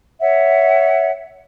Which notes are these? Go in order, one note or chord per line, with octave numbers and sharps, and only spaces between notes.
C#5 E5 F#5